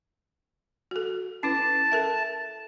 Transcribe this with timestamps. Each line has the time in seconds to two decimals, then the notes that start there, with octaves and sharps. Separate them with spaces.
0.91 F#4 A4
1.43 C#4 E4 B4 A5
1.92 A4 A#4 E5